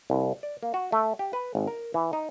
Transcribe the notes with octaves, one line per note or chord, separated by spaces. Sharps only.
C2
D5
A#3
F#4
A3
G4
B4
G#1
A#4
E3
D#4